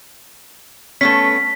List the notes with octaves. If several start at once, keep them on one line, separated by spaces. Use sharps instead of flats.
A3 B3 C#4 B6